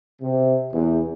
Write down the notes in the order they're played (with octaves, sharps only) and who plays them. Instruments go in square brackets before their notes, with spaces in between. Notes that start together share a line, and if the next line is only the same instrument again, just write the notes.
[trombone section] C3
E2